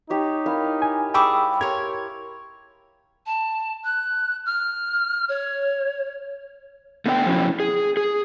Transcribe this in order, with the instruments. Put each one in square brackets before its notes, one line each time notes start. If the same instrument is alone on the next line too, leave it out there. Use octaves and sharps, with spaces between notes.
[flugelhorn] D#4 [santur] G4 C#5
[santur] E4 A#4 F5
[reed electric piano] G#5
[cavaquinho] G#4 C#6 D6 [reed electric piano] G5 B5 E6
[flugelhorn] G4 [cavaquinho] A#4 C#5 [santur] C6 [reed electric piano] G#6
[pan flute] A5
F#6
F6
C#5
[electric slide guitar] A3 B3 D4 D#5 G5
F3 F#3 C#4 E4
G#4
G#4